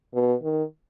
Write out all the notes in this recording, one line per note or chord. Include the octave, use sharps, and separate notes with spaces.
B2
D#3